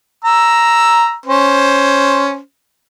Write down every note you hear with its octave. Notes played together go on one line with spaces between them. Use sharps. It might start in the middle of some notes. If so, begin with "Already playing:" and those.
A#5 E6
C#4 C5